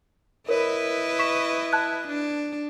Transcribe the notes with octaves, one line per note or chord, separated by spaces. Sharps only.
E4 A#4 B4 C#5 D#5
C#6 B6 E7
A5 F#6 G#6
D4